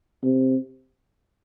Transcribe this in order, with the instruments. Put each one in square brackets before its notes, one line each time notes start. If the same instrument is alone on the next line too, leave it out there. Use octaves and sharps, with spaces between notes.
[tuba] C3